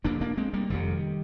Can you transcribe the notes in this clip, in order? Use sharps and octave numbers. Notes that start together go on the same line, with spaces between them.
F1 F2 C3 A#3 D4
A#3 D4
G#3 C4
G3 A#3
F1 F2 C3 D#3 G3